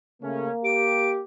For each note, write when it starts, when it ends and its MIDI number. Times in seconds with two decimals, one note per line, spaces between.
0.22 0.49 49
0.22 0.49 57
0.22 1.23 58
0.22 0.49 61
0.64 1.23 67
0.64 1.10 98